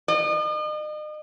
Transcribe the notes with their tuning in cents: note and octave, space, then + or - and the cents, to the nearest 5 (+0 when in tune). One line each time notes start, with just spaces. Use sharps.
D#5 -40